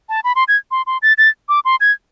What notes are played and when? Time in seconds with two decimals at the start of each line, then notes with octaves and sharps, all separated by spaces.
0.09 A5
0.24 B5
0.36 C6
0.48 G#6
0.71 C6
0.87 C6
1.02 A6
1.18 A6
1.49 D6
1.65 C6
1.80 G#6